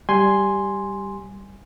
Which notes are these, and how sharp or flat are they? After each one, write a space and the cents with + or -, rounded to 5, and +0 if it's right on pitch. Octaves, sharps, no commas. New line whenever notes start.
G3 +0 G#5 +0 C6 +0